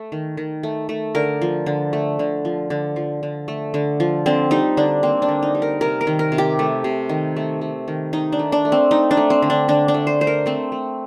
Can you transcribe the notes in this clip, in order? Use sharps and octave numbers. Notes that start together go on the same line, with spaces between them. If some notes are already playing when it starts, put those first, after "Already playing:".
Already playing: A3
D#3
D#3
A3
A3
D3 A#4
F3
D3
A3
D3
F3
D3
F3
D3
A3
D3
F3
D3 C4
G3 D#4
D3 D4
A#3 C4
D4
D3
D#4
G3
A#4
C3 A#4
A#4
D#3
A#4
C3
G4
A3
C3
D#3
A3
A3
D#3
D#3 D#4
D4
A3
D4
A3
C4
A3 D#4
D4
A3
C4
D3
D4
D3 D4
D4
A3
C5
A3 C5
A#4
A3 C4
A3